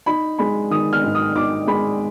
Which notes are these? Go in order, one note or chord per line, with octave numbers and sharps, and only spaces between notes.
D#4 B5
G#3 B5
D#3 D#6
F6
G#2
D#6
D#4 D6
G#3 B5